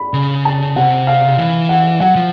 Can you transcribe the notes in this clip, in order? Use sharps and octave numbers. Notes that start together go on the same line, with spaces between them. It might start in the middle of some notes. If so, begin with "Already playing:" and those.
Already playing: B5
C#3
A5
C3 F#5
F5
E3
F#5
F#3 F#5
F3